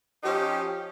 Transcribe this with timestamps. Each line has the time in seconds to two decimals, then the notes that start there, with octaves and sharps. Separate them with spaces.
0.23 F3 C#4 D#4 G4